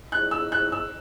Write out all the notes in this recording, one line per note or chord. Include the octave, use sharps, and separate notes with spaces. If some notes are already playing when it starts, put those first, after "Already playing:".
F#6
E6
F#6
E6